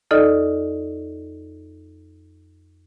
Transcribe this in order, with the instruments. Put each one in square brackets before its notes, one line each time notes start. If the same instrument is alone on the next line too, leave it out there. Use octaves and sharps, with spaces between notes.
[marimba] F2 D#4 A4 D5 D#5 F6